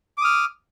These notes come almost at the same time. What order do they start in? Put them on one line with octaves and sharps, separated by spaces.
D6 D#6 F6